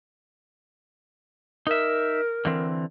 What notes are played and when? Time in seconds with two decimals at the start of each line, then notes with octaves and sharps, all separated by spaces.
1.67 D#4 A#4 E5
2.45 D3 E3 C4